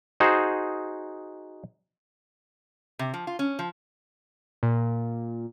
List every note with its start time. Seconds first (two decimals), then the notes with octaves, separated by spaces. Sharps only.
0.20 D#4 F#4 G#4 C5
2.99 C3
3.14 F3
3.27 F4
3.39 C#4
3.59 F3
4.63 A#2